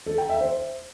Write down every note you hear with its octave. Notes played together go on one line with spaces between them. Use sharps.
A4
G5
E5
C5